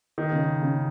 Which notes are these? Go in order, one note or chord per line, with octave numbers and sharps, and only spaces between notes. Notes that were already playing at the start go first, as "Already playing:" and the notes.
D#3
C#3
C#3